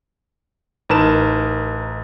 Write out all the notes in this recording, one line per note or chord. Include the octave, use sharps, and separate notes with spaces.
A1 D#4 A#4 B4 A5 E7